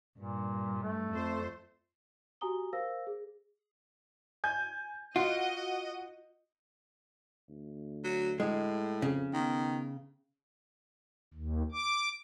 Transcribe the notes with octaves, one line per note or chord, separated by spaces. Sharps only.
G2 A#2
A3
F2 A4 C5
F#4 G4 G#5 A#5 D#6 G7
A#4 C5 F5 E6 A#6
G#4
G#5 G6
F4 F#4 D#5
D2
F#3
A2 G#3
F2 C#3
D#3 B3
D#2
D6